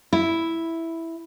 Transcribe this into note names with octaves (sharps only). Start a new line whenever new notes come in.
E4